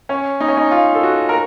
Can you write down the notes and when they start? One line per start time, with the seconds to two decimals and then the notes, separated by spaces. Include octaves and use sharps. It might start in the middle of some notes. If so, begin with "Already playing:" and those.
0.09 C#4
0.40 D#4
0.48 C#4
0.57 D#4
0.71 F4
0.95 A4
1.03 F#4
1.29 A#4